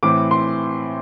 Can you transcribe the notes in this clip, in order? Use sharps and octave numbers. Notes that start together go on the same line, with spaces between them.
A2 E3 C4 D6
C6